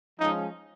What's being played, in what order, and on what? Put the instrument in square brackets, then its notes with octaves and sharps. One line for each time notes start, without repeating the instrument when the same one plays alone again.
[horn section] F3 G#3 C#4 D#4